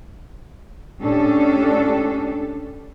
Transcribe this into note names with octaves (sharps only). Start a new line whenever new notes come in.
A2 C#4 D4 G4 A4